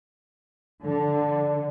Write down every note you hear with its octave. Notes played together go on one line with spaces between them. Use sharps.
D3